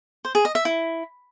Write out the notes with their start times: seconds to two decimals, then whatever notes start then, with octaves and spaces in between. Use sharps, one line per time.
0.25 C5
0.35 G#4
0.45 D#5
0.55 E5
0.65 E4